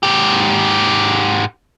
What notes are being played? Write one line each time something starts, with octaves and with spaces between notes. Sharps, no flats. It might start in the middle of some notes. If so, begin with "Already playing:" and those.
G#2 G4